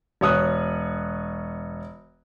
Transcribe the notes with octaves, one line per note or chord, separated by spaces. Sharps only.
E1 C#5 D#6 F#6